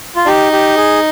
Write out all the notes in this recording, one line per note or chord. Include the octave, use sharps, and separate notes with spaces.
F4
D#4 G4
G4
G#4